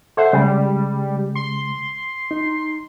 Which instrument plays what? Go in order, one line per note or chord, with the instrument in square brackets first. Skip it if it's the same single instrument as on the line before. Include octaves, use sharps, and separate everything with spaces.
[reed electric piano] A4 E5 F#5 [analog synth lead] C5
[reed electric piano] C#3 G#3 [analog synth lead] G3
[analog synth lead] C6
[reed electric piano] D#4